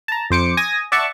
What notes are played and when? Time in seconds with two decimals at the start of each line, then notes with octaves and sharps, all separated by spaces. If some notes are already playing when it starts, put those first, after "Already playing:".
0.08 A5 A#5
0.30 F2 C5 D6 C#7
0.57 G#5 D#6 A#6
0.92 D5 E5 F#5 A5 C#6